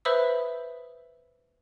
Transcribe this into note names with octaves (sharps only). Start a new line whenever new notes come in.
B4 C5 E5 B5 D#6 E6